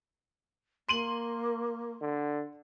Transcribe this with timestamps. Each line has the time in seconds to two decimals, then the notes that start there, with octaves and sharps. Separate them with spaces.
0.89 A#3 C6 D#7 F#7
2.01 D3